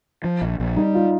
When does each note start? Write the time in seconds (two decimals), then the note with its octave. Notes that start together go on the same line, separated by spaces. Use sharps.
0.24 F3
0.42 A#1
0.60 A#1
0.77 G3 D#4
0.95 F4